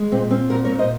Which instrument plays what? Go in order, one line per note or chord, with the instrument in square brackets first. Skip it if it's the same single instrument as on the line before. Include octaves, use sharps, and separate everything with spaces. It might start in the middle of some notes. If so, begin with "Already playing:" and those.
Already playing: [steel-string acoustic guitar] G#3
A#2 C4
C4 C#4
A#2 F#4 A#4
A#4 C#5
A#2
C5 D#5